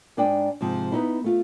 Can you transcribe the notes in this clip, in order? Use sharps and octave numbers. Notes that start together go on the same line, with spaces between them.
G#2 D4 D5 G5 G#5
G#2 C3 F3
B3 D#4 E4
A3 F4